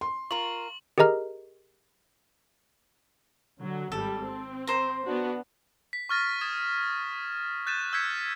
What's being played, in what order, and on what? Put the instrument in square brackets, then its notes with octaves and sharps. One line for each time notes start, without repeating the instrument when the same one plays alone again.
[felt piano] C6
[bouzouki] F4 A#4 [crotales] C#6 F#7
[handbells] G4 G#4 A#4 D#5 A#5 F6
[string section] D3 F#3
[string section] G#1 G3 [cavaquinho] A4
[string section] C4
[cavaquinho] C5 A#5
[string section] B3 D4 F#4
[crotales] B6
C#6 F6 A6 A#6
D#6 G#6 A6 E7
F#6 G6 A6 B6 D#7 E7
E6 G6 G#6 B6 C#7